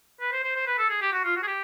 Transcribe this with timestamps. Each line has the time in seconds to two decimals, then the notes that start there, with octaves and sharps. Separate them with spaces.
0.20 B4
0.32 C5
0.44 C5
0.56 C5
0.67 B4
0.78 A4
0.90 G#4
1.02 G4
1.12 F#4
1.24 F4
1.36 F#4
1.43 G#4
1.47 G4